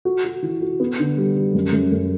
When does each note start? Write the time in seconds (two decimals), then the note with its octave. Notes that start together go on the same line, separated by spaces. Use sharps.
0.05 F#4
0.25 F#4
0.42 E3
0.61 F#4
0.80 B3
0.99 D3
1.17 G3
1.36 G3
1.55 F#2
1.73 F#2
1.92 F#2